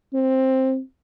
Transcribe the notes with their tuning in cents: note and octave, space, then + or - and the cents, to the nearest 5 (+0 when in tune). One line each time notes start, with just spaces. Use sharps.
C4 +10